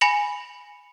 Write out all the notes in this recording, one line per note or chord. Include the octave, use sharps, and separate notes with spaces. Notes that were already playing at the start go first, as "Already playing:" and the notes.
G#5 B5 A#6 C#7 F7 F#7